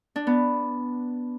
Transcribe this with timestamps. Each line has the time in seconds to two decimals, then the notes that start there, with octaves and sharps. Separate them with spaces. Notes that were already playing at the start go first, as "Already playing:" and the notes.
0.16 D4
0.27 B3